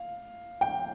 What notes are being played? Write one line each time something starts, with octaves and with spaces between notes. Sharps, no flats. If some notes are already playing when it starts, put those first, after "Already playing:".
Already playing: F5
G5